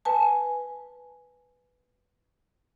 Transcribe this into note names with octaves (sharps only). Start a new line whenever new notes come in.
B4 G#5 A5